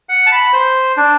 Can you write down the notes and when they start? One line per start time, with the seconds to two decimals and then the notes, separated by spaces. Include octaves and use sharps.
0.09 F#5
0.26 A5
0.32 B5
0.53 C5
0.97 D4